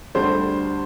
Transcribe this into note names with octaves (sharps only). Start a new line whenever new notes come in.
D2 D3 G3 C5